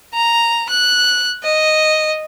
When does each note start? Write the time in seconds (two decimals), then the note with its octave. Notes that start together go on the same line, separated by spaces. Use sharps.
0.14 A#5
0.70 F#6
1.43 D#5